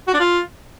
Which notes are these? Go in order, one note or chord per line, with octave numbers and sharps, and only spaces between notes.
F#4
D4
F4